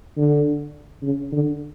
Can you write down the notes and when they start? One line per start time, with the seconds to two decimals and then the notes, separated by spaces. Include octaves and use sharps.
0.17 D3
1.03 C#3
1.32 D3